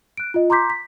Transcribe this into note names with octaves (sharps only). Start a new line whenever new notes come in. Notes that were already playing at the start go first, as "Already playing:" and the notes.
F#6 D7
F4 D#5
A#5 C6 D6 G6 B6
B6